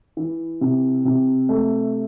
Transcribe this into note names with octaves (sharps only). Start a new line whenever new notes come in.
E3
C3
C3
A3